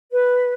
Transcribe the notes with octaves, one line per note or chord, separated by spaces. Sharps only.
B4